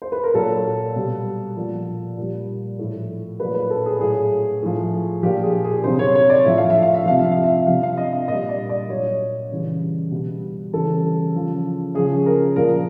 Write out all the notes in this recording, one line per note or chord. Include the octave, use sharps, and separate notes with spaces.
C5
B4
A#4
A#2 F#3 A4
B2 G3
A#2 F3
A#2 G3
A2 F3
A#2 F#3 B4
B4
A4
G#4
A2 F#3 G#4
A2 F3
A#2 F3 G4
G#4
G#4
C3 D#3 F#3 C5
C#5
C#5
D5
A2 F3 E5
F5
E5
F5
E5
C3 F3 F5
E5
F5
E5
C3 F3 F5
F5
D#5
D#5
A#2 G3 D#5
D5
D5
A#2 F#3 C#5
C#3 E3 G3
B2 G3
C#3 E3 G3 A4
C#3 F3
C#3 F3 G#4
A#4
A#2 F3 A#4